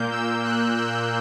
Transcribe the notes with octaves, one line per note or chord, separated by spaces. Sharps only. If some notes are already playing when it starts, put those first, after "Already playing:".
Already playing: A#2 A#3 G6
E6
F#6
E6